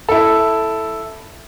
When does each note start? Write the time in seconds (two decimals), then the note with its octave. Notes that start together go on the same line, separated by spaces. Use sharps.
0.09 E4 A4